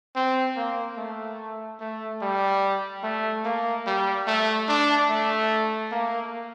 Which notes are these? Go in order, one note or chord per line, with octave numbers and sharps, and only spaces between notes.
C4
A#3
A3
A3
G3
A3
A#3
G3
A3
D4
A3
A#3